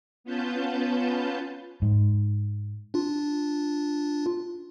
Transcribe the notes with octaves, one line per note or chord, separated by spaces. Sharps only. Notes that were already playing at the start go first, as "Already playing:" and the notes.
B3 C#4 F4 B4 A5 G6
G#2
D4 F4